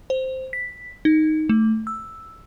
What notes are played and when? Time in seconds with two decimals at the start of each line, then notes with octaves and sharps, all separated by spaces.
0.10 C5
0.53 B6
1.05 D#4
1.49 A3
1.87 E6